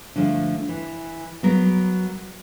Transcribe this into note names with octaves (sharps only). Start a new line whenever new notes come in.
D3 F3 A3
E3
F#3 B3 A#4